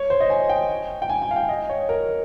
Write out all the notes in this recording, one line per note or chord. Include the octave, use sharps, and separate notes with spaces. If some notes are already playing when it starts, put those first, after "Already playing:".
Already playing: C#5
C5
D#5
G#5
G5
G5
G#5
G#5
F5
G5
D#5
C#5
A#4